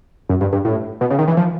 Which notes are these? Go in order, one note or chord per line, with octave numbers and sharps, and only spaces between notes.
F#2
G2
G2
A2
B2
C#3
D#3
E3
F3